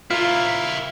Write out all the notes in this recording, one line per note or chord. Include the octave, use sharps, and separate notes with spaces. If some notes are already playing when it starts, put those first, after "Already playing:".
E4 F4 A#4